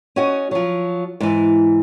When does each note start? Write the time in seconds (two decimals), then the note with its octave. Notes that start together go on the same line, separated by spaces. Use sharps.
0.16 C#4 F#4 D#5
0.51 F3 F#3
1.20 G#2 E3